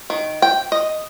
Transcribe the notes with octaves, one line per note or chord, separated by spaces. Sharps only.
D#3
G5
D#5